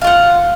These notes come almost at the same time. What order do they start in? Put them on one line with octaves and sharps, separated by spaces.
F5 F4 F#5